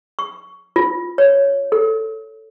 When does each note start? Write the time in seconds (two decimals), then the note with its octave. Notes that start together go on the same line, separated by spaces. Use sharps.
0.19 C#6
0.76 F4
1.18 C#5
1.72 A4